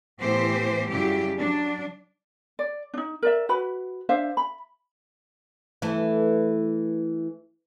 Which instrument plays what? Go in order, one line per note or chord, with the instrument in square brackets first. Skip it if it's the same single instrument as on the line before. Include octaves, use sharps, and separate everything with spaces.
[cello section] A2 E3 B3 G4 C5
F#2 C#3 F#3 G3 E4 G4
F#3 D4
[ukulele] D5
D4 D#4
A#4 D5 E5
F#4 B4 B5
D4 C5 E5 F5
B5
[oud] E3 A3